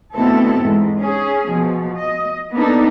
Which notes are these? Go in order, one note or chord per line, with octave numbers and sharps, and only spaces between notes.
D2 B2 B3 C4 E4 A4
E2 G#2
C#4 G#4
B2 F3
D#5
A#3 B3 D4 D#4 A4